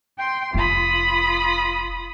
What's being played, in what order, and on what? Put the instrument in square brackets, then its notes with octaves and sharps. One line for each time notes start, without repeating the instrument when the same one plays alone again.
[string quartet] G5 C6
[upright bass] F1 [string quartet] F4 B5 D#6